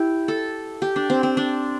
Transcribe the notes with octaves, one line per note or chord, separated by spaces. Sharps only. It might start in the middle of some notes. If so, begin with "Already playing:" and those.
Already playing: E4 G4
A4
G4
D4
C4
C4
D4